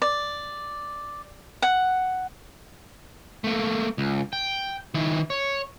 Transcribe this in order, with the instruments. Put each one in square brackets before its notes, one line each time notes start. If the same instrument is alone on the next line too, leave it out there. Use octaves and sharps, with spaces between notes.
[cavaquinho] D5
F#5
[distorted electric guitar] A3 A#3
C#2
G5
D#3 E4
C#5